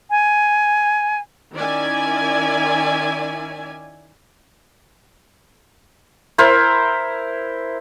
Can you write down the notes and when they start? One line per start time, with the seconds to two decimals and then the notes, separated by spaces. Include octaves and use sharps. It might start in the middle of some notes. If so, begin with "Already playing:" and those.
0.10 G#5
1.54 D#3 C#4 E4 D5 E5 G#5
6.38 E4 A#4 C5 E5